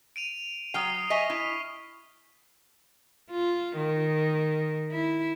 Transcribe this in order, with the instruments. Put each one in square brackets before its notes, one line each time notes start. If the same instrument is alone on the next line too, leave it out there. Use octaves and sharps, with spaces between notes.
[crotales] D7 D#7 F7
[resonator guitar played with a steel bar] F#3 G5 [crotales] D#6 F6 C7
[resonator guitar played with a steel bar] D#5 E5 G#5 [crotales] C#6 B6 D#7
[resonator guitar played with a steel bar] E4
[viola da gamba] F4
D#3
E4